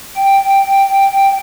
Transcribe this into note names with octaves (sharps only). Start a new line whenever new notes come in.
G5